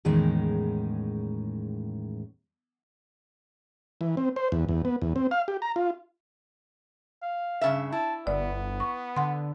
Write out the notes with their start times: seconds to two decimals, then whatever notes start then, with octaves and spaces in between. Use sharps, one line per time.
0.05 E2 A2 D#3 G#3 C#4
4.01 E3
4.17 C4
4.36 C5
4.52 E2
4.69 E2
4.85 B3
5.02 E2
5.16 C4
5.31 F5
5.48 G4
5.62 A#5
5.76 F4
7.22 F5
7.61 G2 C#3 E5
7.92 E4 A5
8.27 G1 B3 D5
8.80 C#6
9.16 D3 F#5 C6